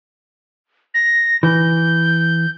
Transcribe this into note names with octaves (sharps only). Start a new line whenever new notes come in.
A#6
E3 G6